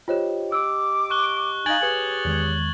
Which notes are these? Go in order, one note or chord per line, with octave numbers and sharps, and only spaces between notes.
F4 G4 C5 C#5 D#5 G5
D6 E6
C#6 F#6 G7
D#4 F5 G#5 G#6 A6 F#7
G4 G#4 B4 C#5 G#5
E2 D#3 G#3